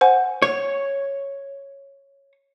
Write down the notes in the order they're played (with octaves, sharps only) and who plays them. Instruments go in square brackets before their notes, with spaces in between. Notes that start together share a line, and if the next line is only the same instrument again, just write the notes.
[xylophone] C5 F#5 G#5
[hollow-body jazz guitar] C#5